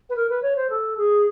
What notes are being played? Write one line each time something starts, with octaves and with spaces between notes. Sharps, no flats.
B4
A#4
B4
C#5
C5
A4
G#4